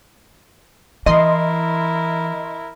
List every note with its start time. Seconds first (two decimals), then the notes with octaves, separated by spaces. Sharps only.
1.06 E3 E4 A#4 D#5 C6